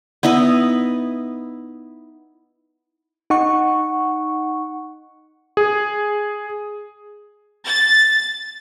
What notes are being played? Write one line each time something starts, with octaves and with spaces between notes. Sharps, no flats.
B3 D#4 E4 D#5
D#4 F#5 C#6
G#4
A6